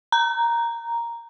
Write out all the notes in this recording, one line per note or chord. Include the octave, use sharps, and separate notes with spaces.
A#5